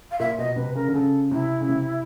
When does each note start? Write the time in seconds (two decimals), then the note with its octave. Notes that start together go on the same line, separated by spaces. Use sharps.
0.11 F5
0.19 A#2 E5
0.38 B2 D#5
0.56 C3 B4
0.75 C#3 A#4
0.88 D3
0.94 C#3 A4
1.31 C3 E4
1.61 C#3
1.69 C3